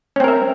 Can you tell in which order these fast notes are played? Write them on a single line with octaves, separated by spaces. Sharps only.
C#4 C4 A#4 E5